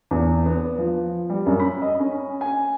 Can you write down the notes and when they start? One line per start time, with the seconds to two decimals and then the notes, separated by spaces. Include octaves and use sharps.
0.11 E2
0.46 B3
0.78 F3
1.30 G3
1.46 F#2
1.60 B5
1.82 D#5
2.00 C#4
2.41 G#5